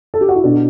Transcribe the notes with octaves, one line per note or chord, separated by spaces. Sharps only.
A4
G4
F#4
E4
B2 D4